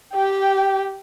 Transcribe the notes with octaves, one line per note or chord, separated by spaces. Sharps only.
G4 G5